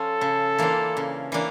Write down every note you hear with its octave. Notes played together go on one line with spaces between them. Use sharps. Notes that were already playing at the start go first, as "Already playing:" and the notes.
Already playing: F3 C#4 F4 A4
C#3
E3 A#3 D4 F4
C#3
E3 A#3 D4